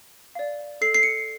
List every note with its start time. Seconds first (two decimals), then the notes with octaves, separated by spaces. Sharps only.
0.35 D5 F5
0.81 A4 C7
0.94 C7
1.03 C#7